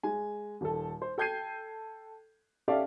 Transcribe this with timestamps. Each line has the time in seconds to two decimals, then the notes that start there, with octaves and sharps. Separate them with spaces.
0.03 G#3 G#5
0.61 D#1 A4
1.02 C5
1.18 A4 G5 G6 G#6 C7 D#7
2.68 C#4 G4 A4 D5 E5 F5